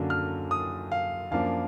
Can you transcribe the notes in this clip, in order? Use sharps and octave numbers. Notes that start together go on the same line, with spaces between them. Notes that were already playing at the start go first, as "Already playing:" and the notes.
Already playing: F#2 D3 F#3 A#3 D4
F6
D#6
F5
F#2 F3 A#3 D4 F5